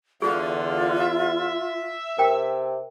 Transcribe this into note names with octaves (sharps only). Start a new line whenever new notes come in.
E2 D3 F4 G#4
E5
C3 A#4 G5